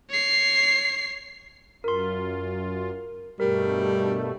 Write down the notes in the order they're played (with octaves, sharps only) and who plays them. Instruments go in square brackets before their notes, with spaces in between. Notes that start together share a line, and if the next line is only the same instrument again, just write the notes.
[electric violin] C#5 C7
[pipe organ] F#2 F4 [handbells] A#4 C6
[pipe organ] G2 B2 A3 [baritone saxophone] G3 [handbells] A#4